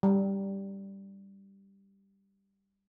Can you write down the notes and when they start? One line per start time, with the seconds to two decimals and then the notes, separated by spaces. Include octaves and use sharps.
0.03 G3